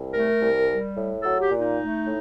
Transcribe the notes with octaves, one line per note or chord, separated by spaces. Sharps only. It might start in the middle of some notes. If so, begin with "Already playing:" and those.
Already playing: C2
A3 A#4
C2
G3
A2
F#3 A4
G4
A#2
D#4
A3
A2